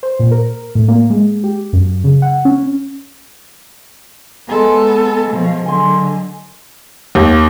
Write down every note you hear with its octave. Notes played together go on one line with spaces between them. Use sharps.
C5
A#2
A#4
A2
A#3
G#3
G4
F#2
C#3
F#5
C#4
G#3 B3 A4 A#5
B2 F3
D3 F#3 G#5 C6
D#2